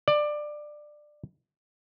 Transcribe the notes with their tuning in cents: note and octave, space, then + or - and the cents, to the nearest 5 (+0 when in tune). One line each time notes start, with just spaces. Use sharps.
D5 +20